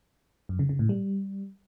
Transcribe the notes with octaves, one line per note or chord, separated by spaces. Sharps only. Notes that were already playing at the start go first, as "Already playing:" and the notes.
F#2
C#3
C#3
A2
G3